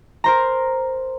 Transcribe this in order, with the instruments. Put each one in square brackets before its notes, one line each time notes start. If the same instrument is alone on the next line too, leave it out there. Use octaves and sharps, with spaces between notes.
[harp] A#4 C5 A#5